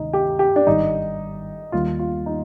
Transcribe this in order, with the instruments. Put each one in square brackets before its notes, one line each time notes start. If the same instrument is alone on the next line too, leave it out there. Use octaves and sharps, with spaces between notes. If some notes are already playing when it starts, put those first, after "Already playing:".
Already playing: [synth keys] D2 C3 D#3 G#3 [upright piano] D#4
[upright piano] G4
G4
D4
[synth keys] G#1 G#2 D#3 G3 [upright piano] D#4
[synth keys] D#2 D#3 G3 A#3 [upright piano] F4
[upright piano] F4
D#4